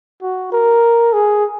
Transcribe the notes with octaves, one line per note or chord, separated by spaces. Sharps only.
F#4
A#4
G#4